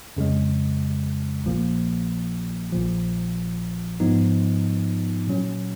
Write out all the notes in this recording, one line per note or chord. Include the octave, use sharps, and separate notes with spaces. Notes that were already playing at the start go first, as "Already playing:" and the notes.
F2 C#3 G#3
A#1 A#2 F3 A#3
A#1 A#2 F3
G#2 F3 B3 D#4
A#2 F#3 C#4